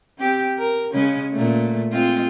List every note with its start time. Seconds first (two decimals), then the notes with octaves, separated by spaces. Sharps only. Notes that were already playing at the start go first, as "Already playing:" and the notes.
0.18 C4 G4
0.58 A#4
0.92 C#3 G#3 C#4
1.31 A#2 A3
1.92 G#3 C4 F4